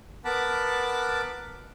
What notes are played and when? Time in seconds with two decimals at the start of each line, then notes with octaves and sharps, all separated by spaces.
0.25 B3 A#4 F#5 A5 B5 D6